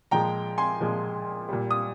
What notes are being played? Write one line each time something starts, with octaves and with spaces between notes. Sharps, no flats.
A#2 F3 G#3 G5 A#5
G#5 C6
A#2 F3 G#3
A#2 G3
D#6